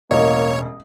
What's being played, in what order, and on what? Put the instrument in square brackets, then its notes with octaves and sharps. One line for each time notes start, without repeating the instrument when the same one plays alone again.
[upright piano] E1 A1 [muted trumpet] A#3 [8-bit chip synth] C#5 [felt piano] D#5